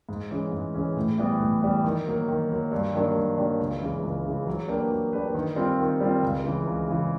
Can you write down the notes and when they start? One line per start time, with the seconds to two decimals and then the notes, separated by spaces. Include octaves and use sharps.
0.09 G#2
0.31 E3 G#3 C#4
0.52 G#2
0.74 E3 G#3 C#4
0.96 A2
1.18 E3 G3 B3
1.40 A2
1.62 E3 G3 B3
1.84 D#3
2.07 F#3 A#3
2.28 D#3
2.49 F#3 A#3
2.72 G2
2.94 D#3 F#3 A#3 D4
3.15 G2
3.38 D#3 F#3 A#3 D4
3.59 C#2
3.82 C#3 E3
4.03 C#2
4.25 C#3 E3
4.47 F#3
4.68 A#3 D4 G4 B4
4.91 F#3
5.13 A#3 D4 G4 B4
5.35 D#3
5.56 G3 C4 F4
5.78 D#3
6.01 G3 C4 F4
6.23 C#2
6.44 C#3 E3
6.67 C#2
6.88 C#3 E3